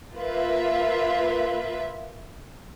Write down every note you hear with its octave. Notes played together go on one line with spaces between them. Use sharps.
A#3 F4 B4 E5